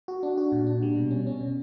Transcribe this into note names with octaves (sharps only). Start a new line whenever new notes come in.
F#4
D4
F#4
A#2
D4
G3
B2
C#4
C#4
B2